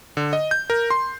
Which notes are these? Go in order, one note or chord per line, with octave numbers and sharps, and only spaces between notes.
D3
D#5
G6
A#4
C6